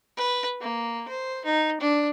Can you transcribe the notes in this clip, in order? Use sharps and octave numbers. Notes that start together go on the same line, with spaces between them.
B4
A#3
C5
D#4
D4